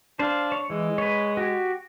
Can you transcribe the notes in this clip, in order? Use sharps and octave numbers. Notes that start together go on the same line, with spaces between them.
D4 C5 F5
C#5
E3 G#3
B4 C#5
F#4 G4